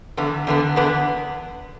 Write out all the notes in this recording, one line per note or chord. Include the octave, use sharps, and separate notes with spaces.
E2 D3 B3
E2 D3 B3
E2 D3 B3